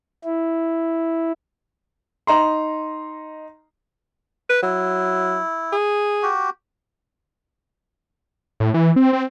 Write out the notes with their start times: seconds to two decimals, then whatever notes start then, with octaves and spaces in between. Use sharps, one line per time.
0.25 E4
2.27 D#4 A#5 C6
4.50 B4
4.63 F#3 E4
5.72 G#4
6.23 F#4 G4
8.60 A2
8.74 E3
8.96 C4
9.13 C4